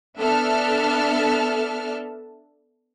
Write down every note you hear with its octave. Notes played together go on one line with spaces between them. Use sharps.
B3 D4 A4 E5 A5 F6